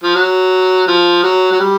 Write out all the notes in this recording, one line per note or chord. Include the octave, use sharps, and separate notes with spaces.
F3
F#3
F3
F#3
F#3
G3